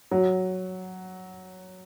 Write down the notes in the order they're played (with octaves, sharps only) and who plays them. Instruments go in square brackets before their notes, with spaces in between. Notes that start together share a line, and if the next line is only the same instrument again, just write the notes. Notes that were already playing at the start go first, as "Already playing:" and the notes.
[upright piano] F#3